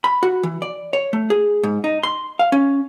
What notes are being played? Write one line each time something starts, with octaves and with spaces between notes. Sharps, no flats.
B5
F#4
E3
D5
C#5
A3
G#4
G#2
D#4
C6
F5
C#4